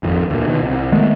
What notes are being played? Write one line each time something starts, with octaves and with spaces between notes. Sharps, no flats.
G#1 F2
D2 A#2
B2 D#3
C2
D#3 G#3 A3 B3